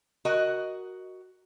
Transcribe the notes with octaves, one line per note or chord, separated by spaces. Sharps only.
F#4 A#4 D#5 F#5